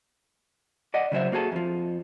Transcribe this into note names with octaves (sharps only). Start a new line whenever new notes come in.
D5 D#5 F#5
C#3 F#3 C5 E5
A#3 F#4 G#4 A4
F2 F3